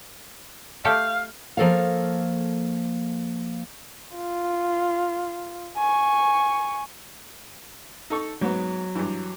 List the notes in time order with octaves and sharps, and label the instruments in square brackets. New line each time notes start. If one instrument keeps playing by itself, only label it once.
[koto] A3 G4 A4 [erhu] F5
[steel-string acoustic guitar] F3 A#3 A4 C#5 F5
[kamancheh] F4
G#5 C#6
[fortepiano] D#4 A4 C#6
[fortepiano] G#2 B3 [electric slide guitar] F#3
[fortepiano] G2 E3